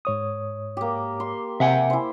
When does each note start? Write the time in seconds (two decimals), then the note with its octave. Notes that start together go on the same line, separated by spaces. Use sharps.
0.05 G#2 C#5 D#6
0.77 A#3 G4
1.20 C6
1.60 C3 E5 F#5 G#5
1.90 E4 C5